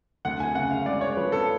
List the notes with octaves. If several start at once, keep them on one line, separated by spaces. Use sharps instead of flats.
D2 F#5
G#5
C#3 F#5
F5
G#3 D5
C#5
F3 B4
A4